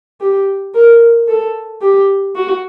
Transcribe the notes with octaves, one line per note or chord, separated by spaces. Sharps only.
G4
A#4
A4
G4
F#4